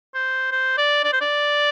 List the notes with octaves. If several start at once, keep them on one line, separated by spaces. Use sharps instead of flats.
C5
C5
D5
D5
C5
D5